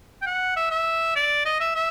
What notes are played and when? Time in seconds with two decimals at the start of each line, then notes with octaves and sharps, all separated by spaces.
0.22 G5
0.26 F#5
0.57 E5
0.71 E5
1.16 D5
1.46 D#5
1.60 E5
1.75 E5